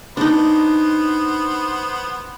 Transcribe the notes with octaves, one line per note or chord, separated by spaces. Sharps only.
B3 D4 D#4 C5